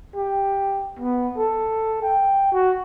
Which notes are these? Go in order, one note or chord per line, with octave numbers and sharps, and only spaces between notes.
G4
B3
A4
G5
F#4